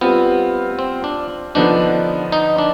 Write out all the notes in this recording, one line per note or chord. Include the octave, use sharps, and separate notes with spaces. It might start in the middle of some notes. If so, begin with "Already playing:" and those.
G3 B3 C4 F4
C4
D4
D3 F3 B3 D4 D#4
D#4
D4